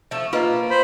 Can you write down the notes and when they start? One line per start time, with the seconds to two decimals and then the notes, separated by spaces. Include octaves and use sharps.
0.11 F3 A3 E5
0.33 A#3 F4 B4 D#5
0.70 C5 B5